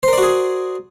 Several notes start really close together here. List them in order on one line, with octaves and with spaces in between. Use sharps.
C5 A#4 D5 F#4 G#4